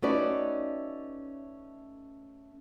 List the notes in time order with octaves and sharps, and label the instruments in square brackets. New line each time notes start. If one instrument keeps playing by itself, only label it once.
[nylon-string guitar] A3 C#4 D#4 F#4 B4 D5